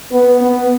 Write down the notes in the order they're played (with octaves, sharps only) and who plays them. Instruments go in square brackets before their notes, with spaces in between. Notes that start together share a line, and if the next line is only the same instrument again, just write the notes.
[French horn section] B3
B3